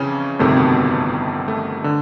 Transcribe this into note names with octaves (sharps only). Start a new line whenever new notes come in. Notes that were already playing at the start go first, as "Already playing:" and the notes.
Already playing: F2 C#3 E3 C#4
G1 F2 C3 D#3 A3
B2 B3
A3
D3